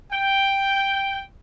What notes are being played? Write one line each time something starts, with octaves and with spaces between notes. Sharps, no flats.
G5